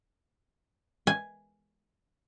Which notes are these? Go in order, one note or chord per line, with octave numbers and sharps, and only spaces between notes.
G#5